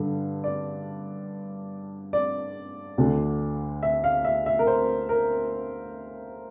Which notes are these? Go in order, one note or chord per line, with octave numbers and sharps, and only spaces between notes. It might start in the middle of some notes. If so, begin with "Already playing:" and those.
Already playing: G2 D3
D5
D5
D2 D3
E5
F5
E5
E5
A#4
C5
A#4